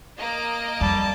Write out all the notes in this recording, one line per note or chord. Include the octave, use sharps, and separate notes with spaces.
A#3 D#5 D7
F2 G3 A5